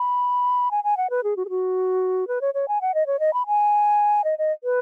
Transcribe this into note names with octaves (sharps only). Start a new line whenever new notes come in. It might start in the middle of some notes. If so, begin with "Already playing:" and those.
Already playing: B5
G#5
G#5
F#5
B4
G#4
F#4
G#4
F#4
B4
C#5
C#5
G#5
F#5
D#5
C#5
D#5
B5
G#5
D#5
D#5
B4